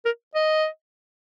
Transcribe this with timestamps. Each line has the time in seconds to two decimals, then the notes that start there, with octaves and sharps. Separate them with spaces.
0.05 A#4
0.35 D#5